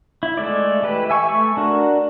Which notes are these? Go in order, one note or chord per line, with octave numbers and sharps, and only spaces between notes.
E4
G#3 A3 D5
E3 G4 B4
E5 G#5 C#6
A3 C#6
D4 F#4 A#4